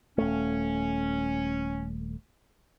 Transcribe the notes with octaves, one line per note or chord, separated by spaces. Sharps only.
D#1 A3 C#4